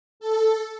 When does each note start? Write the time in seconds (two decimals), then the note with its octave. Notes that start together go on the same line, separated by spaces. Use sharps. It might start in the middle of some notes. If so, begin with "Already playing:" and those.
0.20 A4